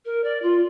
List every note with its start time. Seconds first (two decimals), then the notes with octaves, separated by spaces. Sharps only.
0.05 A#4
0.24 D5
0.42 F4